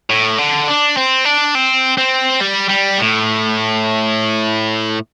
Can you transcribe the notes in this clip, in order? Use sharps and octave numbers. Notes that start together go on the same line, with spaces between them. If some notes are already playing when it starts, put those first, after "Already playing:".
A2
D3
D4
C4
D4
C4
C4
G3
G3
A2